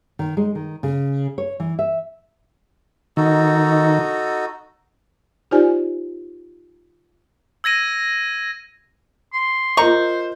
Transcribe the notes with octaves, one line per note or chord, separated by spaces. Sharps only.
D#3
G#3
D#3
C#3
C#5
E3
E5
D#3 D#4 F#4 A4
D#4 F4 G4 C5 D5 G#5
E6 G#6 A#6 D#7
C6
F4 A#4 C5 D#5 A#5 C#6